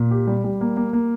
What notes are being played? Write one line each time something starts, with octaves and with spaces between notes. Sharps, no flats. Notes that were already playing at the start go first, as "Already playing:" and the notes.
Already playing: A#2
G4
G3
G3
A#3
A#3
A#3